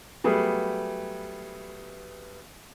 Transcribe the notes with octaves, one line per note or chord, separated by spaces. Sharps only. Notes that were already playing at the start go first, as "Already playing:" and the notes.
F#3 G3 A3 B3 G#4